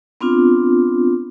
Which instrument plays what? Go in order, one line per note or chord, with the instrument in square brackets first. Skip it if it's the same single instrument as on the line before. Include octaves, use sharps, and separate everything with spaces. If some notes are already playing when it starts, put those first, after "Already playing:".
[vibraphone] B3 C4 D4 F4